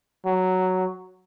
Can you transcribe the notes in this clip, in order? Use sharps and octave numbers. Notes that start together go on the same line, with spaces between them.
F#3